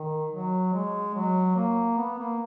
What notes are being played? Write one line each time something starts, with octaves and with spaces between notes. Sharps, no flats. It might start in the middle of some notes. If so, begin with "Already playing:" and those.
Already playing: D#3
F#3
G#3
F#3
A#3
B3
A#3